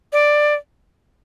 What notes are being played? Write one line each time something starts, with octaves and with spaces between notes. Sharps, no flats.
D5